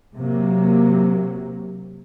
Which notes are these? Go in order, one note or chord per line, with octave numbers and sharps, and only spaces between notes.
C3 F#3 A#3